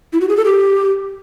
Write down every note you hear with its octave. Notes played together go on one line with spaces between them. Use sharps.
E4
F#4
G#4
A4
G4